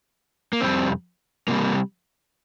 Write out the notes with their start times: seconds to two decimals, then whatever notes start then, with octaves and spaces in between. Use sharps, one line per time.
0.53 A#3
0.61 F2 C3 G3 C4
1.48 C3 G3 A#3